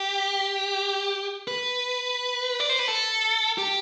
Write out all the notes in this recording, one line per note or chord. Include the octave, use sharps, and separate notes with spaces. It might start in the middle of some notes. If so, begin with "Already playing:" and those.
Already playing: G4
B4
D5
C5
B4
A4
G4